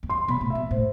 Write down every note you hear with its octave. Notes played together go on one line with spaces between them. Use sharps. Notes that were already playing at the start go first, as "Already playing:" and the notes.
E2
F#2 C6
B2 B5
A2
B2 E5
A2 C5